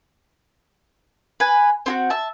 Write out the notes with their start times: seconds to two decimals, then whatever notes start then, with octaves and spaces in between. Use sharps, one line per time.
1.40 B4 G#5
1.86 C4 F4 F#4
2.10 E5 A5